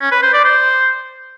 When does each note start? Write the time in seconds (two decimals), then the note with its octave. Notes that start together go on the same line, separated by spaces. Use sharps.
0.01 C#4
0.12 B4
0.22 C5
0.33 D5
0.44 C5